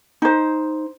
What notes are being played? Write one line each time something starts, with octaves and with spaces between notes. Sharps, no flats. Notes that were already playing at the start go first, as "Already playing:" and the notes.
D#4 C5